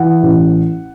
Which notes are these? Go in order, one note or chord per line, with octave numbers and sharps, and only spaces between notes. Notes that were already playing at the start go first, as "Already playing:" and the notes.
Already playing: E3 F#5
A1